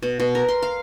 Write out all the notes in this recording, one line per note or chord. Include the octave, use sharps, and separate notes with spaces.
B2
B2
A#4
C6
F5